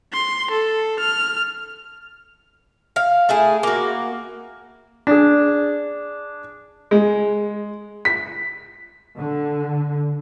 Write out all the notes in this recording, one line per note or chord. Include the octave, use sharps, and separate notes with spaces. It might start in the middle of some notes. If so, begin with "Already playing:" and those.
C6
A4
F6
F5
A3 E4 G#4
A#3 F#4
D4 G#4
G#3
B6
D3